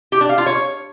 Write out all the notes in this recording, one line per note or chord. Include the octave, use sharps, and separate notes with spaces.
G4
D4
F5
F4
C#5